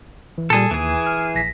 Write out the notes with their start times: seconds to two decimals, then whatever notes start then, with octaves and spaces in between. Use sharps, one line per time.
0.38 E3
0.50 A#2 G3 G#4 A4
0.71 D#2 E3 G#4
1.06 F6
1.35 A#1 A#6 B6